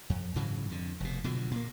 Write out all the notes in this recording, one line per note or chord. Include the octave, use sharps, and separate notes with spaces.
F2
G#2 C#3 E3 F#3
F2 D3
F1 B2
B2 D3 F3 F#3
A#2 A#3